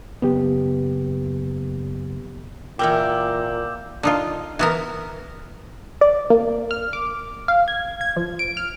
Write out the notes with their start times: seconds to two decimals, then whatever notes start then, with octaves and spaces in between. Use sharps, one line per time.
0.22 F#1 B3 G4
2.79 A#2 E3 A#4 G5 D6 E6 G6
4.03 D3 D#4 F4
4.59 E3 B3 A#4
6.01 D5
6.30 A#3
6.71 F6
6.93 D6
7.48 F5
7.68 G#6
8.01 G#6
8.16 F3
8.39 D7
8.57 F6